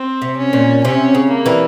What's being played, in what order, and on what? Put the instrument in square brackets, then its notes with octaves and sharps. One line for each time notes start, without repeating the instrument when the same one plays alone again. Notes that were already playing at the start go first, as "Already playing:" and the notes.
Already playing: [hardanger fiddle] C4
[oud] C3
[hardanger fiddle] C#4
[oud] A#2
[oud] C3 [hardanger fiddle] C#4
[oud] C#3
[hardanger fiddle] A#3
[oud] E3 G3